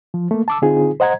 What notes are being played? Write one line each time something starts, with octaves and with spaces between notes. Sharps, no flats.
F3
A3 A#3
A5 D6 E6
D3 C4 D#4 F4 G#4
C5 D#5 F#5 A#5 G#6